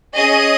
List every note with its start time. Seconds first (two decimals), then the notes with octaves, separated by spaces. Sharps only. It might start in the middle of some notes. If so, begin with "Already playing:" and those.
0.14 C#4 G#4 D#5 D#6